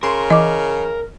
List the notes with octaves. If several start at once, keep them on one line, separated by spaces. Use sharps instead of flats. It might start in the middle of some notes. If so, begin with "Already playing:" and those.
C#3 A#4 C6
E3 D#5 D6